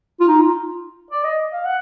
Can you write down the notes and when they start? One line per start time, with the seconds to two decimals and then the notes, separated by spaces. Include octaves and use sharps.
0.20 F4
0.28 D#4
0.41 F4
1.11 D5
1.24 D#5
1.52 F5
1.65 F#5